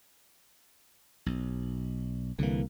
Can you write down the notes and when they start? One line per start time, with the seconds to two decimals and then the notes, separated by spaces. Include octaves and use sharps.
1.26 B1
2.39 C2 D3 E3 A#3